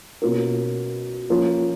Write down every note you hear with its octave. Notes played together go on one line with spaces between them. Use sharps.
B2 A#3 C#4 F4 A#4
F3 A#3 C#4 F4